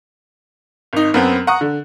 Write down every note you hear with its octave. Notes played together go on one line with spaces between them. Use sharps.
G#1 D#4
F#2 B3 C4
F#5 A#5 C#6 D#6 F#6
D3